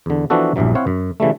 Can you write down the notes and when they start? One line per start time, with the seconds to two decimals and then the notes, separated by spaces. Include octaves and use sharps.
0.06 E2 D3
0.30 E3 F3 B3 D4 F#4 A4
0.56 A#1 E2 G2 E3 F#3
0.75 C4 E4 C#5 F5 F#5
0.87 F#2
1.20 C#3 E3 G3 A3